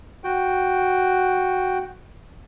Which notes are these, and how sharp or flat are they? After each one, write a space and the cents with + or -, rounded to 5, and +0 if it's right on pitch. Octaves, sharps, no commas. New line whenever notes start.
F#4 +0 G5 +0